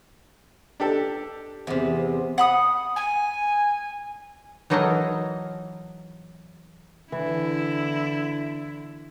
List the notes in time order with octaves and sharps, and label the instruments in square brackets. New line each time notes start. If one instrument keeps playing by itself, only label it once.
[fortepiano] D4 G4 A4
[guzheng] E2 C3
[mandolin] F#5 B5 D#6
[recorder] G#5
[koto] E3 F#3 D#4 A4 A#4 D#5
[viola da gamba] D3 E4 [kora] E3